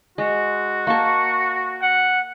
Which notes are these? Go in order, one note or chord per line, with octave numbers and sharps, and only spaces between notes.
G#3 F#4
A#3 A5 C#6
F#5